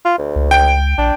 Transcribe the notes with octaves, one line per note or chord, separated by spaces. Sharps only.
F4
D2
C#2
G5 D7
A#1 D4